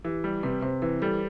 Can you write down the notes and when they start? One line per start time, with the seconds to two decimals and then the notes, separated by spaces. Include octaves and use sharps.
0.04 E3 G4
0.24 G3
0.43 C3 B4
0.62 C3 C5
0.82 E3 B4
1.02 G3 A4